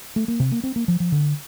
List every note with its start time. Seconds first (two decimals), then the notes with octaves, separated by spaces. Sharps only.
0.16 A3
0.28 A#3
0.40 C3
0.52 A#3
0.64 C4
0.76 A#3
0.88 F3
1.00 F3
1.12 D3